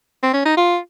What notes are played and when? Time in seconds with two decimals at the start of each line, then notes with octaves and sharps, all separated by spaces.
0.23 C4
0.34 C#4
0.46 D#4
0.57 F4